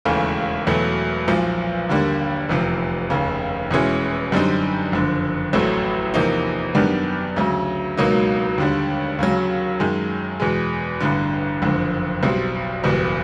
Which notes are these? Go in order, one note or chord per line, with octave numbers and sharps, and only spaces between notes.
E1 D#2 C#3 E3 A3
E2 B2 F#3 A3
B1 A#2 F3
D#2 D3 G3 A#3
F1 E2 C3 F3
F1 D#2 C#3
E2 B2 G#3 C#4 E4
F#2 D3 G3 C4 D#4
F#1 F2 D3
A1 A2 F#3 A3 C4
E2 C3 F3 A#3 D#4
F#2 D#3 G3 B3 D4
D2 C#3 F#3
C#2 B2 F#3 A#3 D#4
D#2 D3 G3
D#2 C#3 F#3
F#2 D#3 G#3
E2 B2 G#3
A1 G2 D3
F#1 F2 D3
B1 B2 G3 C4
F#1 E2 B2 G3